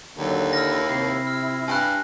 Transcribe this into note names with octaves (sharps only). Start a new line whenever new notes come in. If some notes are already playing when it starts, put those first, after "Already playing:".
D#2 D3 F#3
E4 E6 F6 A#6
C3 C7
F6
G2 G#5 F#6